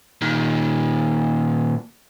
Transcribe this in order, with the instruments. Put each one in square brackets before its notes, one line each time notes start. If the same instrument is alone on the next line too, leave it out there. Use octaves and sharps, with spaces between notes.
[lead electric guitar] A#2 D#3